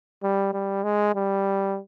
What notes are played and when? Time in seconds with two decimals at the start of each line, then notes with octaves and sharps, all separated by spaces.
0.23 G3
0.53 G3
0.84 G#3
1.15 G3